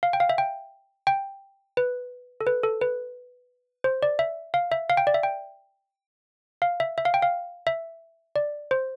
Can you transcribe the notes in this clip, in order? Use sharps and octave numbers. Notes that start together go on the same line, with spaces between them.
F5
G5
F5
E5
G5
G5
B4
A4
B4
A4
B4
C5
D5
E5
F5
E5
F5
G5
D5
E5
G5
F5
E5
E5
F5
G5
F5
E5
D5
C5